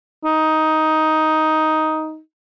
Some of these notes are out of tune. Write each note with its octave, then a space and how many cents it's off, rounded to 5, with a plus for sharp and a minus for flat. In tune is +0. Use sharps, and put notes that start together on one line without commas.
D#4 +10